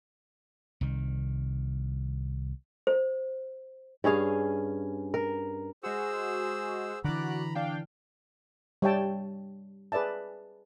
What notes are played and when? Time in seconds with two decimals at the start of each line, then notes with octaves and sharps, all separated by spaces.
0.81 C2 D#3
2.87 C5
4.04 G2 C#4 G#4 F5
5.14 A#4
5.83 G#3 F#4 G#4 C5 E6
7.04 D3 E3 F#4 D5 A#5 B5 F#6
7.55 D4 F5 G5
8.82 G3 G4 C#5 E5 G5 A5
9.92 G#4 B4 D5 E5 A5